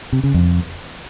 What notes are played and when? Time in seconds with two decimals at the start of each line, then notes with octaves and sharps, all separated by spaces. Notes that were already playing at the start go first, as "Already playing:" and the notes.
0.13 C3
0.23 C#3
0.34 F2